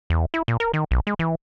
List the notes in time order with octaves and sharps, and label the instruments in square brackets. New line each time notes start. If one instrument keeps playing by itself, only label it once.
[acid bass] E2
E4
A#2
A#4
D#3
B1
G#3
E3